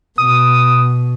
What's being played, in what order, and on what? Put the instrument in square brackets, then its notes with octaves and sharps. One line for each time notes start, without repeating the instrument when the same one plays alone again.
[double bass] B2 [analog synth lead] D#6